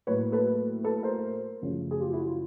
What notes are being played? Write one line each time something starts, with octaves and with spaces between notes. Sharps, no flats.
A2 F#3 A#3 B4 C#5
A4 B4
A4 B4
A#4 C5
F#2 C#3 F3 A3 C#4
G#4
F4 G4
E4 F#4
F4